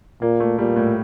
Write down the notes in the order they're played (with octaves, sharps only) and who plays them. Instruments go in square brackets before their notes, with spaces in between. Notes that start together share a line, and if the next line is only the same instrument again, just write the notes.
[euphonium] A#2 [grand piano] A#3
[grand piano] A3
[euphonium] A#2 [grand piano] G3
[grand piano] A2